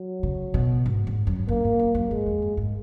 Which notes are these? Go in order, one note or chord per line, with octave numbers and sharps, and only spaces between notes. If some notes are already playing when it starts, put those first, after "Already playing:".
Already playing: F#3
C#3
B2
G#2
G#2
F#2
F#2 A#3
G#2
F#2
F#2
G#2 G#3
F2
F#2
G#2